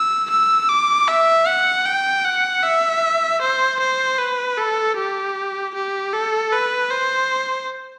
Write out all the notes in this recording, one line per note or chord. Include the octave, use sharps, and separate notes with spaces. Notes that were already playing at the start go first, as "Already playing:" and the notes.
Already playing: E6
E6
D6
E5
F#5
G5
F#5
E5
C5
C5
B4
A4
G4
G4
A4
B4
C5